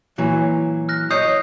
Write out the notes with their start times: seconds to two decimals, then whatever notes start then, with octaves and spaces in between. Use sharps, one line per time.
0.18 A#2 E3 F#3
0.89 F6 F#6 A#6
1.11 C#5 D#5 D#6 G6 C7